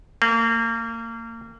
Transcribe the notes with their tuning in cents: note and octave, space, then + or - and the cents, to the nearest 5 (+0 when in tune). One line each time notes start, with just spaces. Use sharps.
A#3 -30